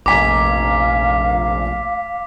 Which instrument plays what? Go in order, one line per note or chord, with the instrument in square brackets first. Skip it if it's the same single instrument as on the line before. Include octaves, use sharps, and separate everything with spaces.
[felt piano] F1 G#5 A#5 [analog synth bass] A#1 [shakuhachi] F5 [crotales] D6 B6